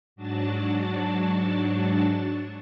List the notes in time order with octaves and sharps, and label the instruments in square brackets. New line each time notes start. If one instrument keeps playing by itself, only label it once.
[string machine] G#2 F#3 D4 F#4 A5 A6